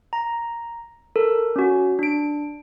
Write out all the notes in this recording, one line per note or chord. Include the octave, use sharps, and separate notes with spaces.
A#5
A4 A#4
C#4 F#4
D4 D7